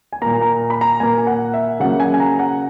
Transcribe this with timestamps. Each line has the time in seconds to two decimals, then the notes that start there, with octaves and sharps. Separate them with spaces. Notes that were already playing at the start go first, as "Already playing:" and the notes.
0.13 G#5
0.21 A#2 A#3 A#5
0.41 A#5
0.70 B5
0.81 A#5
1.00 A#2 A#3 G#5
1.27 F#5
1.54 E5
1.80 C#3 F#3 A#3 F#5
2.00 G#5
2.14 G#5
2.20 A#5
2.39 F#5